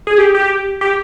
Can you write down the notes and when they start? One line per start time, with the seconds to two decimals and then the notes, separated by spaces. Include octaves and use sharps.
0.07 G#4
0.18 G4
0.35 G4
0.81 G4